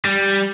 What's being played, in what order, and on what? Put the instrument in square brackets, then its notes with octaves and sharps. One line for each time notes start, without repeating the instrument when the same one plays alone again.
[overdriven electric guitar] G3